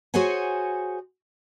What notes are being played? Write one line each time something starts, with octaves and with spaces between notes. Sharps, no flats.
F#4 G#4 C5 C#5 F#5 G#5